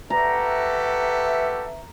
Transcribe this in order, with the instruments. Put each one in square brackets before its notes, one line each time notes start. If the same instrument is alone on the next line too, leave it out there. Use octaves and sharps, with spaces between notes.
[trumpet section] F#4 G4 A4 [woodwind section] B4 E5 [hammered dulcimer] A#5